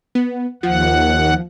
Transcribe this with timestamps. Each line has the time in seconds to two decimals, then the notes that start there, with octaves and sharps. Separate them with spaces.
0.15 B3
0.63 D#2 F3 F#5